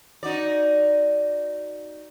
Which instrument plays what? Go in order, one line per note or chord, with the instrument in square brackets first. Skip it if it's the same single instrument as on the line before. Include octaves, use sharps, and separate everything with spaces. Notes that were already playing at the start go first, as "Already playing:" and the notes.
[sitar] D#4 F#4 D5